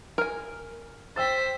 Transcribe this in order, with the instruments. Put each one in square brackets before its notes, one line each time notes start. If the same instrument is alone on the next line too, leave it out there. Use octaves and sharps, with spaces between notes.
[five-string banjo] A#4 G#5
[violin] C5 B6 [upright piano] G5 E6 A6